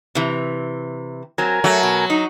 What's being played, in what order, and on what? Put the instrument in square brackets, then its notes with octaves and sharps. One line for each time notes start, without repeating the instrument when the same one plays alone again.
[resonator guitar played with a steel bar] C3 E3
[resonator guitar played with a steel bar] F#3 C4 [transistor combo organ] A#4 G#5
[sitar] F#3 [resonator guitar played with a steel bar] A3
[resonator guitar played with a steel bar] B2
D#4